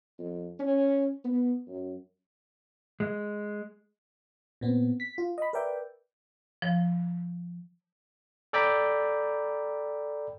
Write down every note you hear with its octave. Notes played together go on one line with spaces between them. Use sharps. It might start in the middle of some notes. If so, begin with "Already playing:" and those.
F2
C#4
B3
F#2
G#3
A#2 B3 C4
B6
F4
D#5 B5
A#4 B4 D5 E5 G5
F3
A4 D5 G5 A#5 B5